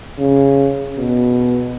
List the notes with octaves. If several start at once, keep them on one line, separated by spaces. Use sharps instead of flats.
C#3
B2